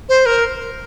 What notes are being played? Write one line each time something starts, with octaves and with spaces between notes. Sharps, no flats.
C5
A#4